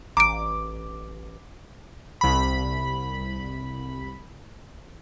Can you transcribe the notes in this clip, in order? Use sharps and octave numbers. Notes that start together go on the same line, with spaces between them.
A1 A#5 D6 D7
C2 B5